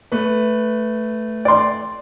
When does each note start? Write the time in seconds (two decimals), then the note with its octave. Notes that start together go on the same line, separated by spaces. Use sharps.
0.12 A3 B4
1.45 D5 C6